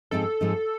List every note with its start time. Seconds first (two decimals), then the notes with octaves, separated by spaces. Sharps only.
0.11 G#2 F3 G#3 C4 D#4 A4
0.41 G#2 F3 G#3 C4 D#4